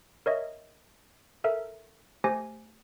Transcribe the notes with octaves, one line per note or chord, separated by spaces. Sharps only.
A#4 C#5 D#5 E5
A4 A#4 E5
A3 G4 C5 G#5 A#6